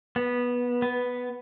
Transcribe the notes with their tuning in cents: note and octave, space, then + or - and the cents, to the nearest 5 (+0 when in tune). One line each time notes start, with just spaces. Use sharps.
B3 -15
B3 +0